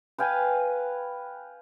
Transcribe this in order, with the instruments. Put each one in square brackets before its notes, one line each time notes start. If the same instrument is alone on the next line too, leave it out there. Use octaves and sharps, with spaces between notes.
[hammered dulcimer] B4 F5 G5 G#5